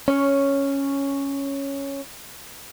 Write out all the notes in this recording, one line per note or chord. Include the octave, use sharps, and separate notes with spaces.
C#4 C#5